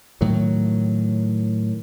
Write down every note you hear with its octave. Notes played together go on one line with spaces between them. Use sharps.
A2 D#3 F#3